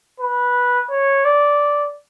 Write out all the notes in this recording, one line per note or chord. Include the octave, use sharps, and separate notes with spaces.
B4
C#5
D5